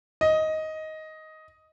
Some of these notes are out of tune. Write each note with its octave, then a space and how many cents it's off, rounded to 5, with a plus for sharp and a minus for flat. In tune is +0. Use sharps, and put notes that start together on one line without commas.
D#5 +10